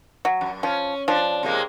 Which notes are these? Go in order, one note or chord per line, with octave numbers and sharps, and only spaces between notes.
F#3
F#2
F3 C#4
F3 D4
C3 G#3 A#3